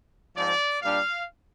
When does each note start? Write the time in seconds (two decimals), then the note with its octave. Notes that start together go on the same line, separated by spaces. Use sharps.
0.35 G#2 F3 C4 D5
0.81 A#2 G3 D4 F5